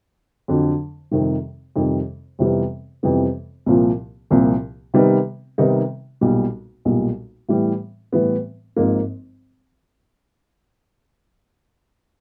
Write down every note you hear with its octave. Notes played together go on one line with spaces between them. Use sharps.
F2 D3 F#3
F2 C3 D#3 G3
F2 C3 D#3 G3
F2 C3 E3 G3 B3
F2 C3 E3 G3 B3
C2 A#2 F3
C2 A#2 F3
C3 D#3 G3 B3 D#4
C3 D#3 G3 B3 D#4
B1 A#2 G3
B1 A#2 G3
A2 E3 G3 B3
A2 E3 G3 B3
G#1 G#2 F3 A#3